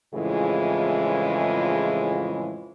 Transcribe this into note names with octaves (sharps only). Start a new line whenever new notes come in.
F2 A2 C#3 E3 G#3 F4